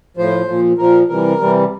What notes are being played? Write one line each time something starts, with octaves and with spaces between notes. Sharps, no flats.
A2 F3 C5
A#2 F3
A#2 F3 A#4
C3 E3 G3 A#4
C3 E3 G3